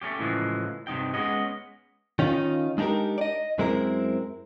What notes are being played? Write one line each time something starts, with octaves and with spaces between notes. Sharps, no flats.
A3 A#3 C#4 G4
A2 C#3 E3 F3 G#3
G2 C3 D#4 G5
G#3 B3 C#4 D#5
D#3 C#4 D#4 F4
G#3 D4 D#4 G4 A#4
D5 D#5
F#2 G#3 C4 E4 A#4